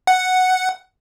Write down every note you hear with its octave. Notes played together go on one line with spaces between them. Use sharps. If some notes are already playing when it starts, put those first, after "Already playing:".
F#5